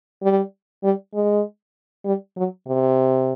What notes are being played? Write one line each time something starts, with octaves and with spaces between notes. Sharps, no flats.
G3
G3
G#3
G3
F#3
C3